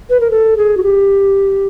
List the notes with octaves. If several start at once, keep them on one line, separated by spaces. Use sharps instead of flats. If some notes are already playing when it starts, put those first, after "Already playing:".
B4
A#4
A4
G#4
F#4
G4